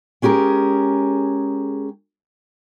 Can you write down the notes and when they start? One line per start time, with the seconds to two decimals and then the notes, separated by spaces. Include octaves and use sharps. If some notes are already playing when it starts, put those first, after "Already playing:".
0.22 G#3 C#4 G4 G#4 A#4